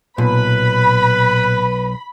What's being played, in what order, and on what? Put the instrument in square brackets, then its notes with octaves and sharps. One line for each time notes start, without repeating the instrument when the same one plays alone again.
[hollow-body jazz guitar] B1 [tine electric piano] A#2 [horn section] B4 [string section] B5